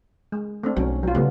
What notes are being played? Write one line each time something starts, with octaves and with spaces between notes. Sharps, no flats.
G#3
A3 C4 D4
B1 F#3 C#4
F#3 F4
C#3 G3 A3 B3